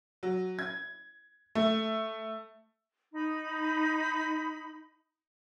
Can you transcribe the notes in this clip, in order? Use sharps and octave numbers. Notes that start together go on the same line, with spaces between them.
F#3
G#6
A3
D#4 B5